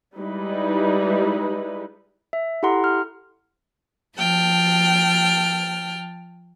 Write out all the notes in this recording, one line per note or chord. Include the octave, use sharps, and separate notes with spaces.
G3 G#3 D#4 E4 B4
E5
E4 G4 A4 F#5 A#5 C6
F6
F3 G5 A5 F6